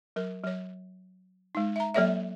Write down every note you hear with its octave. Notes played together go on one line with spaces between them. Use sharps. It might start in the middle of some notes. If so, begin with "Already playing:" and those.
F#3 A#4
F#3 C#5
G#3 D#4
E5 A#5
F#3 A#3 A4 C#5 D5 E5